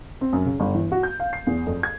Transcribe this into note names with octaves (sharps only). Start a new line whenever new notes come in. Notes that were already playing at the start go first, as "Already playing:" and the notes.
C4
F#2
C#3
G1
E3
F#4
G6
F5
C7
E2
F2
G#6